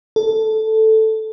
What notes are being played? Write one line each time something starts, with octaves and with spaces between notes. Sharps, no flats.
A4